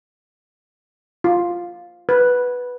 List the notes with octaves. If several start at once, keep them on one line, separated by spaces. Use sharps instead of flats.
F4
B4